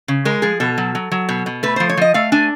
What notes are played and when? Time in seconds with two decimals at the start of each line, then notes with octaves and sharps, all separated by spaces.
0.08 C#3
0.25 G#3 A#4
0.42 F3 G#4
0.60 B2 A4
0.78 F#3
0.95 F#3
1.12 F#3
1.29 B2
1.46 B2
1.63 A3 B4
1.76 F3 C5
1.89 C#5
1.97 F3 D#5
2.14 A3 F5
2.32 D4 G#5